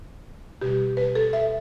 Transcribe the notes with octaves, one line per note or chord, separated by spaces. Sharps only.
B2 G3 G4
B4
A4
E5